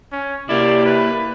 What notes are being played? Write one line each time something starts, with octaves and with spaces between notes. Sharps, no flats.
C#4
C3 A#3 E4 D5
B4